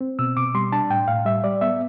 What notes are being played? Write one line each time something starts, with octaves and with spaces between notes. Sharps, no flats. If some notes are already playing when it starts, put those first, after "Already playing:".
C4
B2 E6
B2 D6
G3 C6
D4 A5
A2 G5
A2 F5
G3 E5
G3 D5
B3 E5